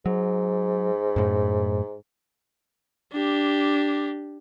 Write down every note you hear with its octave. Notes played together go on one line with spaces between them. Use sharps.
G#2 F#3
F#2 A2
D4 G4